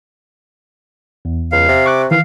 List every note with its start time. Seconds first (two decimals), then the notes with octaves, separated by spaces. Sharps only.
1.25 E2
1.52 C#2 F5
1.68 C3
1.86 C#6 D6 F#6
2.11 D#3 E3 F5